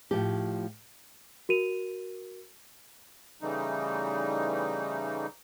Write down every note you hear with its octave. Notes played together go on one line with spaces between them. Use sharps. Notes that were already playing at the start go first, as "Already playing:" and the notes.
A2 F3 G4
F#4 A#4 D#7 F7
C#3 E3 G3 A3 D#4